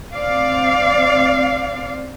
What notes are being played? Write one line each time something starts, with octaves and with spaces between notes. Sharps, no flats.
C4 D5 F5